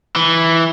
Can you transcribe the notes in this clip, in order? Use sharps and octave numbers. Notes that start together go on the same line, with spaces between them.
E3